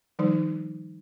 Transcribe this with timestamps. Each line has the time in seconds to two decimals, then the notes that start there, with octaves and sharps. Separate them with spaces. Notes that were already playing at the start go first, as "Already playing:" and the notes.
0.19 D#3 F3 G3 D#4